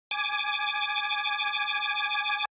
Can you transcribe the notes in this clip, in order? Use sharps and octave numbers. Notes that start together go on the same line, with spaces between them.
G#5 D6